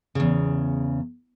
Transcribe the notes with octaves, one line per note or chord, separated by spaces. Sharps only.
E2 C#3